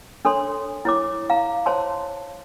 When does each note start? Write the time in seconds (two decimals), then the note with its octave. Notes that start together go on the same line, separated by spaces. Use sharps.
0.25 D4 A4 C#5 C6
0.85 E4 C#5 D6
1.30 F5 A#5
1.66 C5 C#5 A5 C6